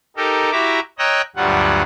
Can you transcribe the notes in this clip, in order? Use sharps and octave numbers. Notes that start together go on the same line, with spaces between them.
D#4 G4 A4 A#4
E4 F#4 G4 E5 A#5 D6
C#5 D#5 G5 A#5 E6 F#6
D2 G2 F#3 G3 F4 F#5